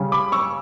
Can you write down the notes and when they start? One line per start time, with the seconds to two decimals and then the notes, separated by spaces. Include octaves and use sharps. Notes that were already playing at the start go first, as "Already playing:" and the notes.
Already playing: C#3 G3
0.12 B5 D6
0.32 C#6 E6